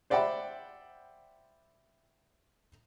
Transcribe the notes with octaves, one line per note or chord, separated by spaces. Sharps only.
C5 D5 E5 F#5 G5 B5